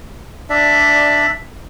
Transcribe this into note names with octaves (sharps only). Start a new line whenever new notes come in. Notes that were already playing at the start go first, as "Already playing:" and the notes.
D4 D5 E5